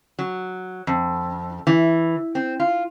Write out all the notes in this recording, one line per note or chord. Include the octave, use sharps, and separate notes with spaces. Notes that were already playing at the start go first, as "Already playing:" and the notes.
F#3
F2
E3
C4
F4